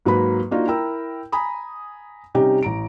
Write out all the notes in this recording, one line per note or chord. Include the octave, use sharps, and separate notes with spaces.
G#2 F#3 A#3 B4 B5
A#3 D4 D#4 F4 F#4
E4 A#4 G5 A#5 E6
G#5 A#5 B5 D#6
C3 G3 C#4 D#4 G4
A1 A#5 D7